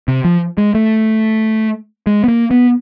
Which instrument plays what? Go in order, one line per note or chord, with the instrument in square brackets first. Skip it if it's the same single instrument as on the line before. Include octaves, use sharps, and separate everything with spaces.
[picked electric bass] C3
F3
G#3
A3
G#3
B3
A#3
B3